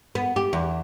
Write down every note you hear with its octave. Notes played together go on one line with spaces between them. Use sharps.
B3
G4
E2